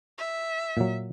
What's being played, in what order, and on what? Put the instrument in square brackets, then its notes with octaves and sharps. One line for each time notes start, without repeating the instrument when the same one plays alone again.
[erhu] E5
[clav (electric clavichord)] A#2 F#3